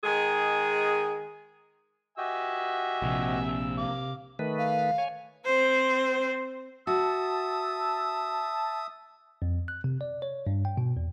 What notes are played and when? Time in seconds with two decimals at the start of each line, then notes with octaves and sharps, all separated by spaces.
0.04 D#3 G#3 G#4
2.18 F#4 G4 D#5 E5 G#5 E6
3.02 A#1 C3
3.77 F5 D6
4.39 D#3 A3 B4
4.58 F5
4.98 C#5 G#5
5.45 C4 C5
6.87 F#4 E5 A5 D#6 E6
9.42 F2
9.68 F#6
9.84 C3
10.01 D5
10.22 C#5
10.47 G2
10.65 G5
10.77 B2
10.97 E2